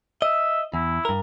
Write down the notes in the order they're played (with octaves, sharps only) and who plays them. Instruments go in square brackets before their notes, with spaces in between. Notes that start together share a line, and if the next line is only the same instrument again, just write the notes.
[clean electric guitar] D#5 [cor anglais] E5
[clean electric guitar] E2 [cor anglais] E4
[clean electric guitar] G2 A#4